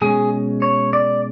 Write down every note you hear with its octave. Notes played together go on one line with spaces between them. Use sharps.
B2 G#3 C#4 G#4
C#5
D5